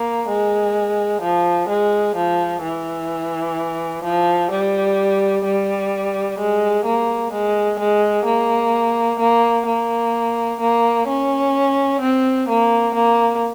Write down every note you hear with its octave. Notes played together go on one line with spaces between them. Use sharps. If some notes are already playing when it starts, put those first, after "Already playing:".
Already playing: A#3
G#3
F3
G#3
F3
E3
F3
G3
G3
G#3
A#3
G#3
G#3
A#3
A#3
A#3
A#3
C#4
C4
A#3
A#3